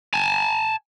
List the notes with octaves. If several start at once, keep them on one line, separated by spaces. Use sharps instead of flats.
G#5 A5